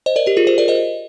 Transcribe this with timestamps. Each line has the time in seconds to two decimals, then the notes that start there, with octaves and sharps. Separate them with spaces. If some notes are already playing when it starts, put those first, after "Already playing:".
0.06 C5 D#5
0.16 A#4 D5
0.26 G4 A#4
0.37 F4 G#4
0.47 G#4 C5
0.58 A#4 D5
0.68 C5 D#5